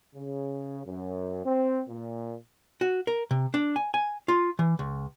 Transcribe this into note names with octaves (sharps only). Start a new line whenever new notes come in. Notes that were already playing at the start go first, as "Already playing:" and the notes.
C#3
F#2
C4
A#2
F#4
A#4
C3
D4
G#5
G#5
F4
E3
C#2